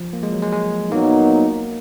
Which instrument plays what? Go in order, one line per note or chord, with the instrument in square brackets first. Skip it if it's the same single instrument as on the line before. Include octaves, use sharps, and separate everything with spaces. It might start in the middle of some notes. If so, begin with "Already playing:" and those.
Already playing: [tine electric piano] F3
A#3
G#3
F#3
G#3
G#3
[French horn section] A#2 F#3 B3 D#4 [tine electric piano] A#3